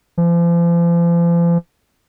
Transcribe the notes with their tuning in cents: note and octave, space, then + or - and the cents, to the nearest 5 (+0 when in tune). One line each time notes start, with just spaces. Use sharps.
F3 -40